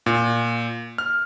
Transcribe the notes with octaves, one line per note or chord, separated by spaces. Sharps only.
A#2
F6